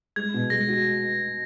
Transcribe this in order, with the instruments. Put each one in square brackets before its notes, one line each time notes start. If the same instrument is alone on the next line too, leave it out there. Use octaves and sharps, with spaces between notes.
[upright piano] G#3 [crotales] G#6
[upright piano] B2
[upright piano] G#3 [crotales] A#6
[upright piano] F#4